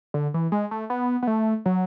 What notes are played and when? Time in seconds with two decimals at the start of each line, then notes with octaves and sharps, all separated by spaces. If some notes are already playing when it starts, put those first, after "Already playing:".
0.14 D3
0.34 E3
0.52 G#3
0.71 A3
0.90 B3
1.23 B3
1.27 A3
1.66 F#3